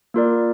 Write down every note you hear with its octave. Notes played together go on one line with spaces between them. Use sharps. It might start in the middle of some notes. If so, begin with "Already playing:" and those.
A#3 F4 A#4 D5